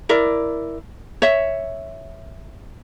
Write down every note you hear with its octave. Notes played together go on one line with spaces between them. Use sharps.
E4 A#4 D5
C#5 E5